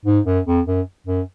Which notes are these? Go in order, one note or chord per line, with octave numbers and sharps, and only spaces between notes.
G#2
F#2
F2
F#2
F#2